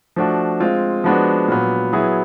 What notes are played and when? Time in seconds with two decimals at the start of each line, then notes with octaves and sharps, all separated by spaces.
0.16 F3 A3 D4 F#4
0.60 G#3 C4 F4
1.04 F3 G#3 B3 D4 F#4
1.48 A#2 F#3 B3
1.93 F#3 B3 E4 G#4